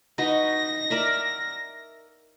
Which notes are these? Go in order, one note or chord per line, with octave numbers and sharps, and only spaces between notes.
D#4 F#4 B4 A#6
A#4 D5 E5